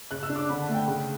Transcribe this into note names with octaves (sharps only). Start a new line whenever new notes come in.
C#3 F#6
E6
D4
D6
D3 B5
A5
A3
G5
C#3